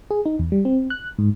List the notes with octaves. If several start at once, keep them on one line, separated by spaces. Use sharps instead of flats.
G#4
D#4
E2
G3
C4
F#6
G#2